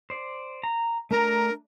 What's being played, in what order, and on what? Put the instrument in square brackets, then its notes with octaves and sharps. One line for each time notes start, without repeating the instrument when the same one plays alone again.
[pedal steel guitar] C5 D5
A#5
[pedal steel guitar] A3 D4 A#5 [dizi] A#4